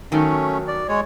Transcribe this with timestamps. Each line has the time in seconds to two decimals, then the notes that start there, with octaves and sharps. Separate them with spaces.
0.12 D#3 F#3 A3 C#4
0.68 D5
0.88 G#3 C#5